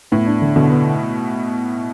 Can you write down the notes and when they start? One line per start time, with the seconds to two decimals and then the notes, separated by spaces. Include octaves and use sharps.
0.12 A2 B3
0.26 D4
0.41 D3
0.56 B2 D3
0.70 B3